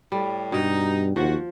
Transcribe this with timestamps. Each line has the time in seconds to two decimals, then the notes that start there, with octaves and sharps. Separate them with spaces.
0.12 A2 G3
0.52 G2 B2 D#4
1.16 D#2 F3 F#4